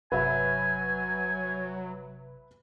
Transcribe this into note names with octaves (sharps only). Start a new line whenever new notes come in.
G1 C3 F#3 B4 E5 G#5 B5